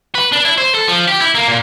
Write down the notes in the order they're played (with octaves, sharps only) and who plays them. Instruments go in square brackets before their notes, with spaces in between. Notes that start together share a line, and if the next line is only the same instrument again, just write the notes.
[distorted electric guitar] B4
D4
E4
C5
A4
F3
G4
E4
A#3
A#2